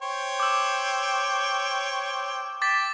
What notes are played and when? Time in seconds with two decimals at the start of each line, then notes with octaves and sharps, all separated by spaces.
0.02 C5 C#5 G5
0.40 D6 E6
2.62 G5 D6 A6 B6